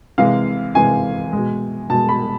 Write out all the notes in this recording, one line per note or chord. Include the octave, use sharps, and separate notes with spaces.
C3 E3 G#3 F5
C3 E3 G#3 G#5
B2 G#3
B2 G#3 A5
B5